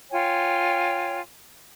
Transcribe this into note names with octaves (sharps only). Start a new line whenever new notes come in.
F4 C#5 G5 G#5